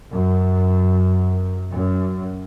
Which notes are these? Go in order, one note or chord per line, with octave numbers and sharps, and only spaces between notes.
F#2
F#2